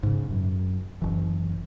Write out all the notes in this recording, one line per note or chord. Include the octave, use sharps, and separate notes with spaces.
G#2 C#3
F#2
F#1 E3